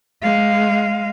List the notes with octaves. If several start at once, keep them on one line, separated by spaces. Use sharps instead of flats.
G#3 F5